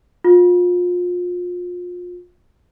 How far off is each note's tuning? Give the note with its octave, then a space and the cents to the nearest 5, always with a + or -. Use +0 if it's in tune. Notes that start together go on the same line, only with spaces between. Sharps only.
F4 +30